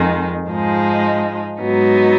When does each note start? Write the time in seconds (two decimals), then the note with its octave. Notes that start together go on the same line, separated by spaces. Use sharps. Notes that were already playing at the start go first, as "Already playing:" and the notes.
Already playing: F2 D#3 G#3 D#4
0.48 G#2 F3 G#3 D#4
1.61 G#2 F#3 B3 D#4